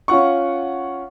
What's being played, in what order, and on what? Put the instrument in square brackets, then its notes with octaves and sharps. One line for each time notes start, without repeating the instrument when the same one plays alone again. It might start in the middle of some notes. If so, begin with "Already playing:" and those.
[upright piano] C#4 F4 F#5 C#6